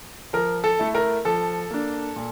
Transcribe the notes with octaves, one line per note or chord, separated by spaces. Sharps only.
F3 A#4
A4
A3 E4
A#4
F3 A4
A#3 D4
A#2